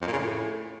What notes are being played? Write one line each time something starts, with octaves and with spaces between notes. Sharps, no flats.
F2
A#2
C#3
A2